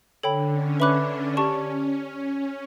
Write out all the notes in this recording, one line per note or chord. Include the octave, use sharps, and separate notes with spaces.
D3 A4 C#5 G5 B5
C#4
D4 B4 E5 B5 D6 F#6
C#4 G4 D5 A5 C#6